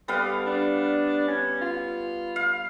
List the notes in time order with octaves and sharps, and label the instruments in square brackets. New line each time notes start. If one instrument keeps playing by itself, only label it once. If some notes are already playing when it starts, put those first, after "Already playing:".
[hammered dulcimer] G3 B3 F5 [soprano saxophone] A4
[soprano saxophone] D4
C#4
F4
[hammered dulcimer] F5